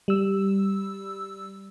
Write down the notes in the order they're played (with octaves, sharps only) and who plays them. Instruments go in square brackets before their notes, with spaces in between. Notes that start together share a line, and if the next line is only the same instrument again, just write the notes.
[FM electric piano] G3 E6